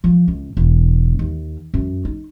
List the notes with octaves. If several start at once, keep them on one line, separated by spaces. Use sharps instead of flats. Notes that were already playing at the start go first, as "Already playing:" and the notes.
F3
C#2
E1
D#2
F#2
D#4